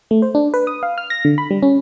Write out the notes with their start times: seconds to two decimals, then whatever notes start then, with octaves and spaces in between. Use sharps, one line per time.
0.11 A3
0.22 C5
0.35 D4
0.54 B4
0.67 D#6
0.83 F5
0.98 F6
1.10 A#6
1.25 D3
1.38 B5
1.51 G3
1.63 C#4